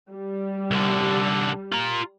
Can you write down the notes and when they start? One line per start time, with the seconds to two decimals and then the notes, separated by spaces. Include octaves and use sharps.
0.11 G3
0.71 C2 D3
1.73 F4 A#5